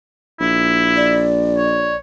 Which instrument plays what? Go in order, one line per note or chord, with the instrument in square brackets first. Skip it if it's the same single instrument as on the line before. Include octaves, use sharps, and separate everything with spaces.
[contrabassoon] A#1 [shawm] E4
[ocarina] D5
[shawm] C#5